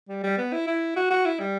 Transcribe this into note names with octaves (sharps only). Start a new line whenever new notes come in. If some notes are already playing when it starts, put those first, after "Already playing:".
G3
G3
B3
E4
E4
F#4
F#4
E4
G3